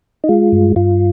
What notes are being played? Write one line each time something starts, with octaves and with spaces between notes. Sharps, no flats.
D#4
G#3 F4
G2
G2 F4